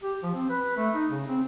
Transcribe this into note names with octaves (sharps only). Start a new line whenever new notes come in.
G4
F3
C4
B4
A3
D#4
C#3
C4